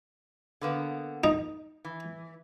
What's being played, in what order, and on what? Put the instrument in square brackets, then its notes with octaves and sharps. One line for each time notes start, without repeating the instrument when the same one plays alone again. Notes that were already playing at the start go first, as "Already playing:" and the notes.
[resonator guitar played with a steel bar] D3 A#3 B3
[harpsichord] D#4
[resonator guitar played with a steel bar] E3